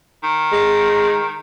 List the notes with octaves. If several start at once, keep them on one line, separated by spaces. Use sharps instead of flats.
D#3
G#3